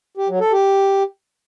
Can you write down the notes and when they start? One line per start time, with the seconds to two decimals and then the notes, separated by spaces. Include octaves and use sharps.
0.17 G4
0.29 F#3
0.40 A4
0.52 G4